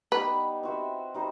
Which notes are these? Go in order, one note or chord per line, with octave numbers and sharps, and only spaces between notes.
G3 B3 D#4 G4 B4
C4 F#4 C5 E5
G3 D#4 F#4 C5